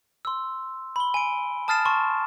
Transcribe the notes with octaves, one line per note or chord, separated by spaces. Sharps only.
C6 E6
B5 G7
G#5 D7
A5 D#6 F6 A6 C7 E7
A5 C6 C#6